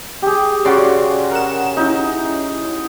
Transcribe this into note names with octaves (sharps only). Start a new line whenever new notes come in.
G4 G#4
C#3 F#4 D5 C6
A#4 F#5 E7
C#4 D#4 E4